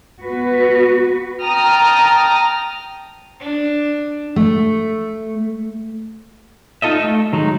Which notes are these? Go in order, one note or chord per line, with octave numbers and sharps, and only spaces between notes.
B3 F#4 B4
G5 A5 A#5 D#6 F6
D4
A3
D#4 F4 A4 D#5 E5
A3
D#3 F#3 G#3 D#4